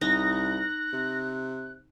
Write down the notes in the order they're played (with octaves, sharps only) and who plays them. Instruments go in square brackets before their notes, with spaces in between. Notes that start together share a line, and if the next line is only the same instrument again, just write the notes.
[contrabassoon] C2 [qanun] D#4 [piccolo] F#6 [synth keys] A#6
[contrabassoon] C3